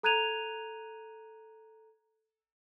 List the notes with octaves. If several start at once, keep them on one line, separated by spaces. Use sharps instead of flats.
A4 A#5 F#6 G#6 D#7 F7